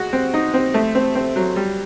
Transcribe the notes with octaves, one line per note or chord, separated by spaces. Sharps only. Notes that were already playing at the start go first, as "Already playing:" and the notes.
Already playing: G#3 F#4
C4
D#4
C4
A3
C4
C4
F#3
G3